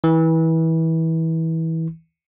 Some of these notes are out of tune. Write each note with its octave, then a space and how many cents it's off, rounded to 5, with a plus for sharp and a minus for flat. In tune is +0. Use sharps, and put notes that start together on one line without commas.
E3 -25